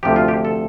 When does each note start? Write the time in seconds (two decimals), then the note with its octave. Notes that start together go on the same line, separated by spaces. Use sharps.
0.03 D2 C3 F3 G4
0.16 F4
0.28 G4
0.45 A4